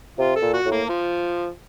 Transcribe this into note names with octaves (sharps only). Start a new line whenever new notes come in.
C3 F4
A4
A#2
F#4
A2
A#3
F3